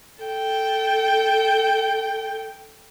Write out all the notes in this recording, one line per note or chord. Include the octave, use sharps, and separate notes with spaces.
A4 G5